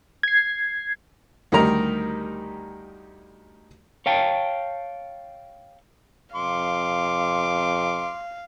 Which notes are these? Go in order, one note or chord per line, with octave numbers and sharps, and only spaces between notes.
G#6 C7
D2 D#3 G3 D#4 A#4 A#5
C#5 F5 G5 A5
F2 F5 C6 D6